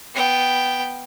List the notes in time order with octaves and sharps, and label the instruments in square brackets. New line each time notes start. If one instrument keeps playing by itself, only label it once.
[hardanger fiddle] B3 G5